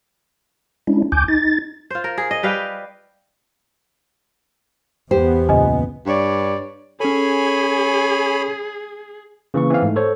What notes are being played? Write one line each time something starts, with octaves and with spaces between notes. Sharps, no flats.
G#3 C#4 D4 E4
D2 G#5 D6 G6
D#4 A6
F4 C5
A#4
G#4
D#5
G3 B4 F5 G5
E2 B3 G4 C5
C#2 A#2 D#5 G#5
G2 C#5 D5
C#4 G#4 A4 C#5 G#5 B5
C#3 E3 A#3 C#6
E3 C4 F5
G#2 A3
A4 C5 C#5